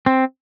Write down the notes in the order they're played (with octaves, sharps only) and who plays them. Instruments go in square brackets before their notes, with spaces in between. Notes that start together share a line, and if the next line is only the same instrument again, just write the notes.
[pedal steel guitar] C4